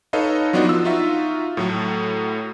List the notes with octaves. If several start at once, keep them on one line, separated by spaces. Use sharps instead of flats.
D#4 A4 B4 C#5 D#5 F5
F3 F#3 B3 D4 D#4 F#4
F4 E6
D#4 F4 F#4 E5
A2 F#3 A3